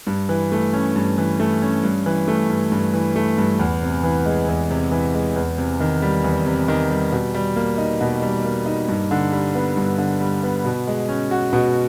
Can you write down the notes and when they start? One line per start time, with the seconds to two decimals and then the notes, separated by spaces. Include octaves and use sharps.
0.07 G2
0.29 E3
0.52 A3
0.73 C#4
0.96 G2
1.18 E3
1.40 A3
1.62 C#4
1.83 G2
2.06 E3
2.28 A3
2.49 G2
2.72 G2
2.94 E3
3.16 A3
3.38 G2
3.59 E2
3.82 C3
4.04 E3
4.25 G#3
4.48 E2
4.70 C3
4.91 E3
5.14 G#3
5.36 E2
5.58 C3
5.80 D#3
6.02 G3
6.24 E2
6.46 C3
6.68 D#3
6.90 G3
7.12 B2
7.35 G3
7.56 A#3
7.78 D#4
8.01 B2
8.22 G3
8.44 A#3
8.66 D#4
8.88 G2
9.11 D3
9.32 G3
9.55 B3
9.77 G2
9.98 D3
10.20 G3
10.43 B3
10.65 B2
10.87 G#3
11.09 C#4
11.31 F#4
11.53 B2